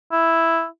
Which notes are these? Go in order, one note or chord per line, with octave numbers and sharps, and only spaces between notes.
E4